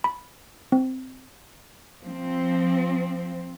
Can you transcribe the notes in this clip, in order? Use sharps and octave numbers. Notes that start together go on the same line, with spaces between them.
B5
C4
F3 C4